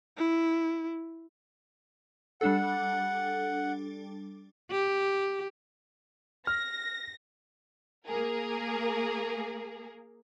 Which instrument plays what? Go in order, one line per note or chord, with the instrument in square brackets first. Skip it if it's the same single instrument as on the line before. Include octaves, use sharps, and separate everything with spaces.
[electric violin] E4
[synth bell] G3 D4 A4 [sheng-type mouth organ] F#5
[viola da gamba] G4
[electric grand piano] F6 [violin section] A#6
[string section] A#3 G#4 A#4